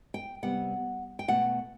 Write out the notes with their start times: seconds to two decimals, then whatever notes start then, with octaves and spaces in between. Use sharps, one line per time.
0.14 G5
0.43 C3 G3 B3 F#5
1.19 G5
1.28 B2 A3 F#5